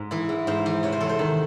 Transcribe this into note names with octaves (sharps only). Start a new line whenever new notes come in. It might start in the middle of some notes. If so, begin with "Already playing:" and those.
Already playing: G#2 G#3
E3 E4
G#2
G#2 C5
E3
C3 C#5
C5
E2 A4
C5
D#3